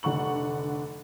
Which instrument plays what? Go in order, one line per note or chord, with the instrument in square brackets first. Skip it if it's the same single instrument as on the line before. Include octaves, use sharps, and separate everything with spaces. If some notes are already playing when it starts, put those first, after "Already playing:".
[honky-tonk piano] F1 D3 F#5 C#6 F#7